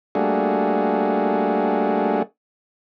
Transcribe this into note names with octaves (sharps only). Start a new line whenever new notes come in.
G3 A3 A#3 D4 F#4 G#4